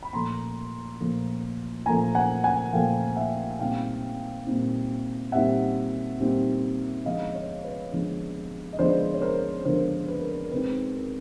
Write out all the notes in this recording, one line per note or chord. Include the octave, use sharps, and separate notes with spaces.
B5
A#2 F3 A3 A#5 C6
A#2 F3 A3
A#2 F3 A3 G#5 A#5
F#5 G#5
F#5 G#5
A#2 F3 A3 F5 G5
E5 F#5
A#2 G3 C4 D#4 F5 G5
A#2 G3 C4 D#4
A#2 G3 C4 D#4 E5 F#5
A#2 G3 C4 D#4
D3 F3 G#3 B3 D#5 F5
C#5 D#5
B4 C#5
D3 F3 G#3 B3
D#5
D3 F3 G#3 B3 C5 D5
C#5
A#4 C5
D3 F3 G#3 B3 A#4 C5
B4
A#4
B4
A#4
B2 G#3 C4 D#4 B4
A#4